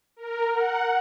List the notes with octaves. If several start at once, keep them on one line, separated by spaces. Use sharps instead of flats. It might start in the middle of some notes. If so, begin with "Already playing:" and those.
A#4
F#5